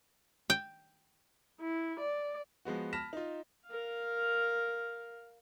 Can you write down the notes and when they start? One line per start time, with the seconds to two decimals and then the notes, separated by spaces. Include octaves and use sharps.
0.50 G5
1.61 E4
1.99 D5
2.65 F3 G#3 B3 F#4
2.93 A5 B5 F6 A#6 B6 E7
3.13 D#4 F4
3.67 A#4 F5